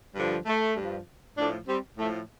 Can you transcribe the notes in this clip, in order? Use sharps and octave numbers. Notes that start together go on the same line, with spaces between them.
G2 D3 F3
A3
G2 F3
A2 F3 A3 D4
G3 C4
A2 F3 A3